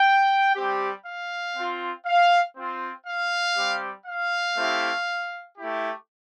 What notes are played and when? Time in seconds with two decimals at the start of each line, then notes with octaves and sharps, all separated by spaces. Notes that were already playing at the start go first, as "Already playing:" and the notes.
Already playing: G5
0.55 G3 C4 G4
1.06 F5
1.56 C4 F4
2.06 F5
2.56 C4 F4
3.07 F5
3.56 G3 C4 G4
4.06 F5
4.56 A3 C4 E4 G4
5.57 A3 E4 G4